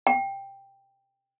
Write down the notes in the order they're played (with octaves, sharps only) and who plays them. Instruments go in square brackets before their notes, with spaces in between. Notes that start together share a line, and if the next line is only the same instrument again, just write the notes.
[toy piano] G5